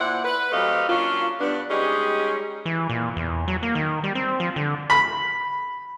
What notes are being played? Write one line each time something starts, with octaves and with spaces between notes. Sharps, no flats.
A#2 E4 C5 D5 F#5
B4
F#3 A3 C4 G4 D#5 F5
F#3 A#3 C#4 D4 F4
G2 B3 D4
G3 G#3 C#4 D#4 G4 G#4
E3
A#2
E2
F#3
A#3
D#3
G3
C4
F3
D3
B5